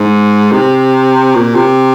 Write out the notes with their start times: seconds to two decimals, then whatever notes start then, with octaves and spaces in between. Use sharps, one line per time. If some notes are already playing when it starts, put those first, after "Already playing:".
Already playing: G#2
0.52 C3
1.35 A#2
1.55 C3